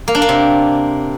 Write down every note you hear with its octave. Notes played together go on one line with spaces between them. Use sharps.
A#3
D4
A#3
C3